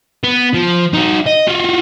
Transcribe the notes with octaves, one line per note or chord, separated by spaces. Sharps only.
B3
F3
D#4 F#4
D#5
F4 F#4